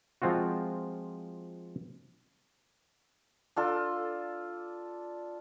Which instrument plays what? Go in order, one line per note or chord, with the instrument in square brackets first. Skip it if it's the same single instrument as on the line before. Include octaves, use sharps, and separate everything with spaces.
[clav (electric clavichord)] F3 G#3 C4 F4 F#4
[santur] D4 F4 A4